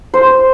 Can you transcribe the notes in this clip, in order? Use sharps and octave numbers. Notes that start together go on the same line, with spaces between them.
C5